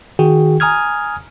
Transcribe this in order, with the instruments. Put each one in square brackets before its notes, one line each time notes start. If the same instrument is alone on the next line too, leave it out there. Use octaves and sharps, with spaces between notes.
[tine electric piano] D#3 F#4 G#4 G5
G#5 A#5 D#6 F6 G#6